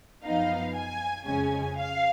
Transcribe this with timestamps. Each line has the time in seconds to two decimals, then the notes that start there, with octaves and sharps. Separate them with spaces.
0.23 F#2 F3 B3 D#4 F5
0.74 G#5
1.25 F2 C#3 G#3 C#4 G#5
1.77 F5